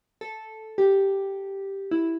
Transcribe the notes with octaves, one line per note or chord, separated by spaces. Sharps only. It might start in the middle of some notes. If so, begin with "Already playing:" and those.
A4
G4
E4